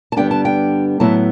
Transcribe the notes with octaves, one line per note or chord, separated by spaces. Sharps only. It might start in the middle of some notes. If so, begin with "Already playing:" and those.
A5
G2 D3 G3 B3 D4 G5
A5
G5
A2 F#3 B3 E4 A5